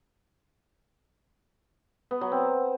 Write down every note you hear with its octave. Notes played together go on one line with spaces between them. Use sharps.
B3
F#3
C4